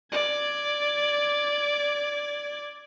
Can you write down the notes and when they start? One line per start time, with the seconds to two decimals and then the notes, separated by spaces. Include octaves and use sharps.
0.12 D5 G#6